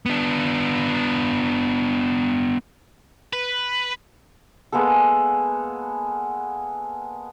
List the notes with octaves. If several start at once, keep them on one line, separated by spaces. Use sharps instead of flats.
B3 D4
B4
G#3 A#3 B3 A4